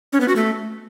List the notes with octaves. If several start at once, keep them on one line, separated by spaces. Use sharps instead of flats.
C#4
B3
F#4
A3